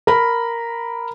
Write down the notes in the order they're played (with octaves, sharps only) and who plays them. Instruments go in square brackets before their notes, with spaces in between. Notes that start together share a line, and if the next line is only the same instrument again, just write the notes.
[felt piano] A#4 B5